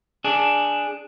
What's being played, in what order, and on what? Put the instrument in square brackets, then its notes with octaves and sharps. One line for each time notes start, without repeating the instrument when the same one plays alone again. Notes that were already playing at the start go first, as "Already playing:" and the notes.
[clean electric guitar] D4 G#4